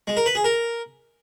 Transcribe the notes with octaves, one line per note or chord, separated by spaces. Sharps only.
G#3
A#4
B4
G#4
A#4